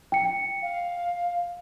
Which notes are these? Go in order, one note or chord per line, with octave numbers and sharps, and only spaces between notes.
G5 C#7
F5